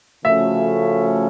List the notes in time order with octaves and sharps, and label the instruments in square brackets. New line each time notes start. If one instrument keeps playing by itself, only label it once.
[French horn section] C#3 F3 A3 C#4 F#4 [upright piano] E5